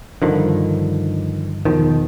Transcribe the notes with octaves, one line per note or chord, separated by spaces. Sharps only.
G2 D3 D#3 F3
E2 B2 D#3 F3